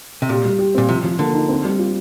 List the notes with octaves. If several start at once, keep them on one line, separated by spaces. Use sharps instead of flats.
C3
A#2 G4
G3
G4
A#2 C4
C3 F3
F3
D3 A#3
D#4
C4
G3
F4